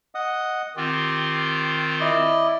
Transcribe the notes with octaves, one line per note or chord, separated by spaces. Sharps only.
D#5 F#5 D#6
D#3 C4 F4 G4
E4 D5 D#5